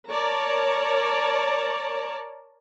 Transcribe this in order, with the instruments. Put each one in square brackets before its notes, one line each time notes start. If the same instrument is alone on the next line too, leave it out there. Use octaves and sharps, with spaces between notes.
[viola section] A#4 C#5 D5 A5 A#5